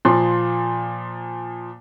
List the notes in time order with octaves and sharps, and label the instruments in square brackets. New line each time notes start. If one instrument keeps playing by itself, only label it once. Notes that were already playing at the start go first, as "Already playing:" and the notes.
[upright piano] A#2 F3 C6